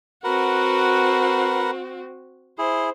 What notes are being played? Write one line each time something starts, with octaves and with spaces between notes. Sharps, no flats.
C4 F#4 A#4 B4 F#5
E4 G#4 C5